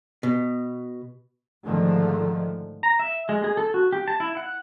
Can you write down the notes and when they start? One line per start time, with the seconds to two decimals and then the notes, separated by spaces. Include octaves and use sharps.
0.23 B2
1.63 G#2 D3 D#3 F3 A3
2.83 A#5
2.99 E5
3.29 G#3
3.44 G#4
3.57 A4
3.74 F#4
3.93 G4
4.08 A5
4.20 E4
4.37 F#5